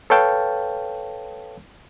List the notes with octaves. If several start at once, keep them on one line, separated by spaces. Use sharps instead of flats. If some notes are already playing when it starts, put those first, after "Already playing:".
A4 B4 C#5 F5 G5 A5